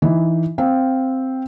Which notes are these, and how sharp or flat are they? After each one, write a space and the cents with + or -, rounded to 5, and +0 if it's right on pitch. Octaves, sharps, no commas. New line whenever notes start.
E3 +0 D#4 +0
C4 +0 F5 +0